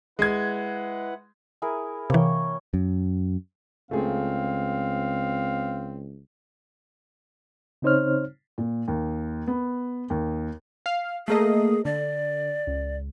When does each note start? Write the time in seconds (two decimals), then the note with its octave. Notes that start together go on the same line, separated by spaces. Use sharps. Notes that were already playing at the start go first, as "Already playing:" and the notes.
0.19 G#3 E4 B4 F#5 G#6
1.62 E4 G#4 A#4
2.10 C3 E3 A#3 C#5 G5
2.74 F#2
3.91 C#2 A3 C4 F4 G#4 F5
7.82 C#3 C4 D#4 C5 C#5 F6
8.58 A#2
8.88 D#2
9.47 B3
10.10 D#2
10.86 F5
11.28 A3 A#3 G#4 D#5
11.85 D3 D5
12.67 C#2